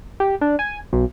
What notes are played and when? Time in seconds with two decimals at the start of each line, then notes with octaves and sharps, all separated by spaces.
0.20 G4
0.41 D4
0.59 G#5
0.93 B1